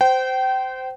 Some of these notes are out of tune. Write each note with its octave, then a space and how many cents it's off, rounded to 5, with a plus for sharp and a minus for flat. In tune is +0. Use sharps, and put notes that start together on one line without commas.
C5 -15 G5 -30